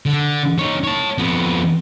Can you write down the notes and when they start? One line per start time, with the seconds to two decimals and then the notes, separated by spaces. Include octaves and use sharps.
0.06 D3
0.59 D#4 C#5
0.84 C#5 A5
1.18 F2 B3